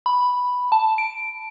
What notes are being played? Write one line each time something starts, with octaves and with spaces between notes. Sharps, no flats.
B5
A5
D7